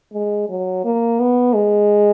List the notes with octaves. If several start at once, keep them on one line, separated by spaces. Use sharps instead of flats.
G#3
F#3
A#3
B3
G#3